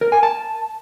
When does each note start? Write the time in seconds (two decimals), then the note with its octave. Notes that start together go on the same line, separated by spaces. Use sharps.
0.01 A#4
0.12 G#5
0.23 A5